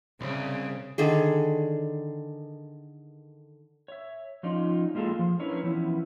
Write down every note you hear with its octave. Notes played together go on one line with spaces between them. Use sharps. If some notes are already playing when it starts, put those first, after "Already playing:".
C2 C#3
D3 D#3 G#4
C#5 E5
F3 C#4 D#4 F4 D5
G#3 A#3 F4 G#4 A4
F3
C#4 D4 E4 A#4 B4 C#5
E3 F3 B3 C#4 E4